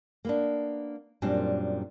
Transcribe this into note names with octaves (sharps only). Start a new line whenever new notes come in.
A#3 B3 D4
F#2 A#2 G3 C4 D4